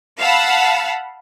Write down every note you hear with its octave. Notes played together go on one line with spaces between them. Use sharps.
F5 F#5 A5 B5 E6